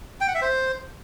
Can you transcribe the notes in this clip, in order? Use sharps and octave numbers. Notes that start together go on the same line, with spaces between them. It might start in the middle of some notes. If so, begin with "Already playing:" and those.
G5
F#5
E5
C5